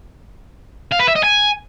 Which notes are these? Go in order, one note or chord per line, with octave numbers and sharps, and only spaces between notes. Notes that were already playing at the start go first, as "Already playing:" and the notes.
F5
B4
E5
D#5
G#5